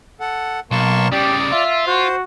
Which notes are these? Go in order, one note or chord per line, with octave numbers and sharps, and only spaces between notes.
A4 F#5
B1 A#3 A5 C6 C#6
C#3 G3 G4 D5
F4 E5
F#4 C5